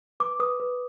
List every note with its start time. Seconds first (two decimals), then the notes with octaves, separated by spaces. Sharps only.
0.20 B4 D6
0.40 B4 D#6
0.60 B4